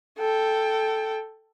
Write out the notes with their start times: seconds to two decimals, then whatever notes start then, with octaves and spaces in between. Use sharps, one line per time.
0.18 A4 G5